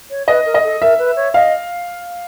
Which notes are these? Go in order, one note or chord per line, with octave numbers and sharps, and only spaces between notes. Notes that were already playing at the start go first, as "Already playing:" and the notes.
C#5
B4 D#5
A#4
D#5
A4
A#4 E5
B4
C#5
D#5 F5